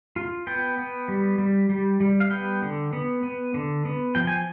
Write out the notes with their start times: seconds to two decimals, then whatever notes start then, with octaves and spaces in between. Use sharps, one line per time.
0.16 F4
0.47 B3 G5
0.78 B3
1.08 G3
1.38 G3
1.69 G3
2.00 G3
2.20 F5
2.30 B3 G5
2.62 D3
2.93 B3
3.23 B3
3.54 D3
3.85 B3
4.15 F3 G5
4.27 G#5